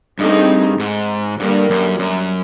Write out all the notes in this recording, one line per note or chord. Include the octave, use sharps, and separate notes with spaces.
G2 A3 C4 D#4 G#4
G#2
G2 D3 G3 A#3
F#2
F#2